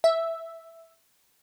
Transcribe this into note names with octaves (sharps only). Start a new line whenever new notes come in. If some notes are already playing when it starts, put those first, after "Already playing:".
E5